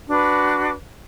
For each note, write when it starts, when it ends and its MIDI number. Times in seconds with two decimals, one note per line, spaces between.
0.08 0.71 62
0.08 0.71 66
0.08 0.71 71